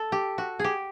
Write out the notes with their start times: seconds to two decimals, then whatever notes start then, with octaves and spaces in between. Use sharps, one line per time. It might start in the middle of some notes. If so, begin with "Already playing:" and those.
Already playing: A4
0.12 G4
0.38 F#4
0.59 G4 G#4